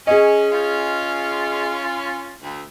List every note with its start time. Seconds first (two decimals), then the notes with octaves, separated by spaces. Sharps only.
0.07 C#4 G#4 D#5
0.52 C#4 F4
2.42 D2